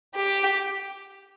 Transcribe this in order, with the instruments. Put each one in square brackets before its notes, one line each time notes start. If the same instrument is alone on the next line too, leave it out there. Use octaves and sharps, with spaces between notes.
[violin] G4